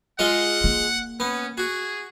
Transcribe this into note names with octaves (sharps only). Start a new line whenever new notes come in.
G#3 F4 D#5 F#5
A#3
B3 C#4
F#4 G#4